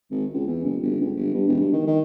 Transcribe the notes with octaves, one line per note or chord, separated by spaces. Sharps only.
G#1
C#2
E2
F#1
G1
C#2
G1
G2
E1
G2
D#3
D#3